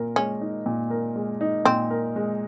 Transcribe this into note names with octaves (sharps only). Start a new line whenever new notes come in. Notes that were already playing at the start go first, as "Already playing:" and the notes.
Already playing: A#2 A#4
G#3 C#4
D#4
A#2
A#4
G#3
D#4
A#2 C4
A#4
G#3